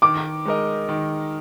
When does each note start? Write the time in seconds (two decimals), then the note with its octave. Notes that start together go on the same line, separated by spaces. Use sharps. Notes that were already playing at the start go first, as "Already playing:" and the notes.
0.02 D#3 D6
0.45 G#3 D#4 A#4 D#5
0.89 D#3